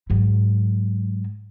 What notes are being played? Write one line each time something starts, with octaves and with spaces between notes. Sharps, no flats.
G#2 F#3